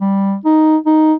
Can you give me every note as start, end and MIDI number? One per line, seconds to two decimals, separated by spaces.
0.01 0.36 55
0.45 0.77 63
0.86 1.14 63